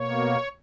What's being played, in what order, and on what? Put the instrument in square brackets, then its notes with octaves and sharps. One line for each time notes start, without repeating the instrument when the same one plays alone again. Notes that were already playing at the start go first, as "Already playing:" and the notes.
Already playing: [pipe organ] B2 A#3 C#5